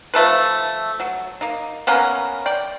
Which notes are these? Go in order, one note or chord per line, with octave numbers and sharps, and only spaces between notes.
F3 A3 A4 B4
F#3
A#3 D#4
A#3 B3 C#4 A#4
D5 G5